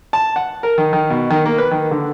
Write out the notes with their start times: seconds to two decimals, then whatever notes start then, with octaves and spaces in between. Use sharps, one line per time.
0.13 A5
0.36 F#5
0.63 A#4
0.78 D#3
0.93 D#3
1.10 B2
1.30 D#3
1.46 A#3
1.58 B4
1.71 D#3
1.91 D3